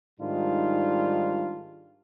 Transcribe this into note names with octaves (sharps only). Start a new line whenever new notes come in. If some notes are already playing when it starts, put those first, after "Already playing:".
G#2 D#3 G3 D4 F4